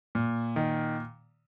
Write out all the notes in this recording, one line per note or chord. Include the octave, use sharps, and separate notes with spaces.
A#2
D#3